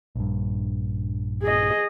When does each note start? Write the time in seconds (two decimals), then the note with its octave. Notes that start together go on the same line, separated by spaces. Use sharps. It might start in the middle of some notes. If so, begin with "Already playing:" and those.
0.15 A#1 G2
1.43 G#4 D#5